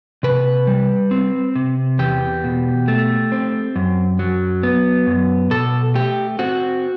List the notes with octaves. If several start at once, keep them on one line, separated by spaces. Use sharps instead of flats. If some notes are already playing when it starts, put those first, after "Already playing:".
C3 B4
G3
C4
C3
E2 G4
B2
A3
C4
F#2
F#3
B3
F#2
B2 A4
A3 G4
C4 F#4